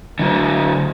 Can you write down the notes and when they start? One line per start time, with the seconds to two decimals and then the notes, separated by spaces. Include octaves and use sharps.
0.19 D3 F#3